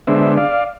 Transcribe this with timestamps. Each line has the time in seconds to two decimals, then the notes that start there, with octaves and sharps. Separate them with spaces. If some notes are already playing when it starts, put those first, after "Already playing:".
0.07 D3 G#3 B3 D4 C5 E5
0.37 D5 F5